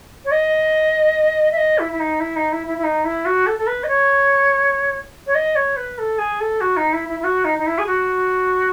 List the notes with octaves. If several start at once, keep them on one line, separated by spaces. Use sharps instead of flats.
C#5
D#5
E5
D#5
E4
E4
D#4
E4
D#4
E4
E4
E4
D#4
E4
F#4
A4
A4
B4
D#5
C#5
C#5
D#5
C#5
B4
A4
G#4
A4
F#4
D#4
E4
E4
E4
F#4
D#4
D#4
E4
G#4
F#4